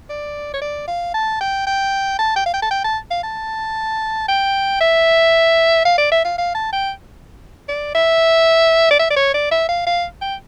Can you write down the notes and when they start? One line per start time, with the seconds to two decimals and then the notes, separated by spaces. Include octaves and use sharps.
0.09 D5
0.54 C#5
0.61 D5
0.88 F5
1.14 A5
1.41 G5
1.66 G5
2.19 A5
2.36 G5
2.46 F5
2.54 G5
2.62 A5
2.71 G5
2.84 A5
3.10 F5
3.23 A5
4.28 G5
4.80 E5
5.85 F5
5.98 D5
6.11 E5
6.25 F5
6.38 F5
6.55 A5
6.72 G5
7.68 D5
7.95 E5
8.91 D5
8.99 E5
9.10 D5
9.16 C#5
9.34 D5
9.51 E5
9.69 F5
9.86 F5
10.21 G5